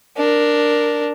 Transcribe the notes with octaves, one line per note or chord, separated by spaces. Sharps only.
D4 A#4